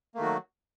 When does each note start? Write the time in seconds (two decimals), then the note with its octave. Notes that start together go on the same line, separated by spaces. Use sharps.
0.14 A#3
0.17 A3
0.20 D#3
0.22 F#4
0.25 F#3